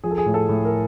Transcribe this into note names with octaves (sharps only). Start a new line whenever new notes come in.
F3 G#4
A4
G#4
A2
A4
A2
A#4